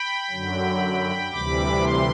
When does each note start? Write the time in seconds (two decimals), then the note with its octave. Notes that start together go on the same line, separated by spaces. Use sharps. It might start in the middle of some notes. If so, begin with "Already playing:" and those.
Already playing: G5 B5
0.30 F#2 D3 F#3
1.32 D2 C3 E3 G3 B5 D6
1.83 C6